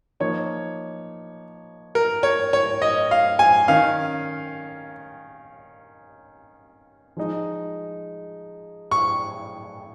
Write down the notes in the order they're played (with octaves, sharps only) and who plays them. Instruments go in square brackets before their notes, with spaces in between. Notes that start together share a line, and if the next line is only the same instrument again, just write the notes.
[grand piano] F3 A#3 D#4 C#5
A#4
C#5
C#5
D#5
F5
G#5
D#3 C#4 F5
F3 G#3 D#4
C#6